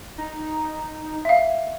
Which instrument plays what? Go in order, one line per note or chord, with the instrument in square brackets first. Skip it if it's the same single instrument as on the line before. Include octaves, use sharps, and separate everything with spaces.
[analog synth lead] D#4
[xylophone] E5 F5